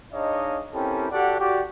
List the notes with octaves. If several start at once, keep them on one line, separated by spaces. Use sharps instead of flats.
D4 D#4 G#4 C#5 D#5 F5
C4 C#4 E4 G4 A4 A#4
F#4 G4 A4 D5 F#5
F#4 G4 D5